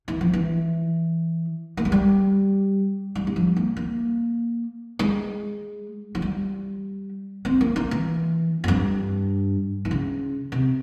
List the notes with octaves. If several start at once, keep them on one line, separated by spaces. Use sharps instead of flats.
E3
F3
E3
A#3
G#3
G3
G3
G3
F3
A#3
A#3
G#3
F3
G3
C4
A#3
A#3
E3
F2
G2
E3
C#3
C3